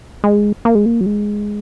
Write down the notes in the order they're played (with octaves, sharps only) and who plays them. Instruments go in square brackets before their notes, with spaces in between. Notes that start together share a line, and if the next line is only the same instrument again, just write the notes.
[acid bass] G#3
A#3
G#3
A#3
F#3
G#3